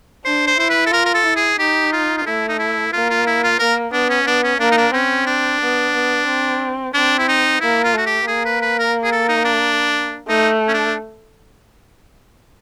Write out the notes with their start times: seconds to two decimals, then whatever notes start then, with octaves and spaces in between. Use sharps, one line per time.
0.25 D4 C5
0.47 C5
0.59 E4 C5
0.70 B4
0.87 A4
0.92 F4 A#4
1.06 A#4
1.14 A4
1.26 E4
1.36 G#4
1.59 D#4 G4
1.93 F4
2.18 F4
2.26 A3 E4
2.49 D#4
2.59 E4
2.93 A#3 F4
3.10 F4
3.27 E4
3.44 F4
3.59 A#3 A#4
3.93 B3 D4
4.09 C#4
4.26 B3 D4
4.44 C#4
4.60 A#3 D4
4.72 D#4
4.77 D4
4.93 C4 C#4
5.26 D4
5.61 B3
5.94 B3
6.28 C4
6.94 C4 D4
7.19 E4
7.28 D#4
7.61 A#3 E4
7.84 F4
7.94 A3 F#4
8.06 G4
8.28 A#3 G#4
8.45 B4
8.62 B4
8.79 A#4
9.04 G#4
9.12 A4
9.28 D#4
9.45 D4
10.29 A3 D#4
10.68 C#4
10.74 D4